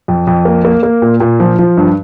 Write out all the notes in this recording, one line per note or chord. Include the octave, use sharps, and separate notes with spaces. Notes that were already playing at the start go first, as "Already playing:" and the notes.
F2
F2
A#3
A#3
A#3
A#2
A#2
F3
F3
G2